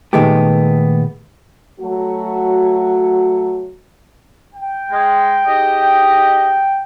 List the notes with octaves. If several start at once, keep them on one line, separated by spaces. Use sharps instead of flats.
A#2 D#3 G#3 A3 B3 G4
F#3 A3 F#4
G5
G#3
G#2 G4 D#5